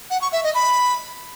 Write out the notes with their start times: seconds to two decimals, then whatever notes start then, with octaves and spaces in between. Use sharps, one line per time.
0.10 F#5
0.21 C#6
0.32 E5
0.43 D#5
0.54 B5